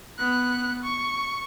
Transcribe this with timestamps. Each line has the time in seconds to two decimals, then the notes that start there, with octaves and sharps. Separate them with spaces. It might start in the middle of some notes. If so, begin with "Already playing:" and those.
0.19 B3 F#6
0.84 C#6